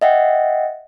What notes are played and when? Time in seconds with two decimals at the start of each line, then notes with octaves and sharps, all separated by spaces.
0.02 D#5 E5 F#5 G5